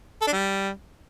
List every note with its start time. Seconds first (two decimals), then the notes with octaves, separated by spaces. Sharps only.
0.22 A4
0.27 D4
0.33 G3